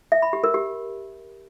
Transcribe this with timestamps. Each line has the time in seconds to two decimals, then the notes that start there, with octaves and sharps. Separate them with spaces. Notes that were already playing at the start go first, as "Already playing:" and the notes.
0.12 E5
0.22 B5
0.33 G4
0.44 A#4
0.54 G4